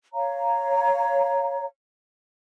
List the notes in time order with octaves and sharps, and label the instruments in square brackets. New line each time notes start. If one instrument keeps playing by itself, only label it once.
[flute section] C#5 F5 A#5